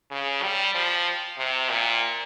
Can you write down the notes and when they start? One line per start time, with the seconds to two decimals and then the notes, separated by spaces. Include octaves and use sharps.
0.11 C#3
0.43 G3
0.75 F3
1.38 C3
1.69 A#2